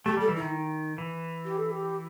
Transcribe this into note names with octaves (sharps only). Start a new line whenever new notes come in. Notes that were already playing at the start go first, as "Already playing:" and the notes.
A3 G4
G3 A4
E3
E4
D#3
E3
G4
A4
G4